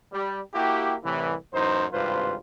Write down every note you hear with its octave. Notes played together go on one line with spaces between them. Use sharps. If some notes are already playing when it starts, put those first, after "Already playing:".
G3
A#3 E4 F#4 G4
C2 A2 E3
F#2 A2 E3 D#4 C5
G#1 G2 C3 F4 B4 C5